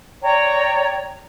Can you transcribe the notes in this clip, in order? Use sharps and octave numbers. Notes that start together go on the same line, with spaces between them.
C#5 D5 G5 A#5